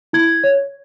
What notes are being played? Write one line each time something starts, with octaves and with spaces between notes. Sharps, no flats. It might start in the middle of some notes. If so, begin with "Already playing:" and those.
E4 G#6
C#5